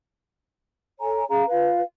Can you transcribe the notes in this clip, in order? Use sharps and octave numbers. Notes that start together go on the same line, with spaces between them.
A4 C#5 G#5 A#5
C#4 G#4 F5 A#5
F4 B4 F5